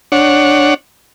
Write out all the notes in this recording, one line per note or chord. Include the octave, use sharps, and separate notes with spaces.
D4 C#5 F#5